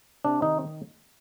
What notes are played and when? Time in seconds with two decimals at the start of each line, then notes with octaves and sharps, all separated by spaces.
0.25 C3 D4
0.42 D#3 D#4